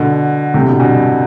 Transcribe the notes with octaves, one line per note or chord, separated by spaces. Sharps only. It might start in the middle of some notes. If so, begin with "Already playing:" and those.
Already playing: B2 D3
A2 C3
B2 D3
G2 B2